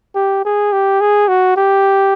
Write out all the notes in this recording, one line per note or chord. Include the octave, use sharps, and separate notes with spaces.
G4
G#4
G4
G#4
F#4
G4